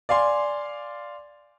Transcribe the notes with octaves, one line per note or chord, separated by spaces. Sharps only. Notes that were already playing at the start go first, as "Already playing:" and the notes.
D5 F5 G#5 C6